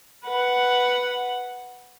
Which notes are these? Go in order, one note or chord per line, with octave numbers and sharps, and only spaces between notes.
B4 F#5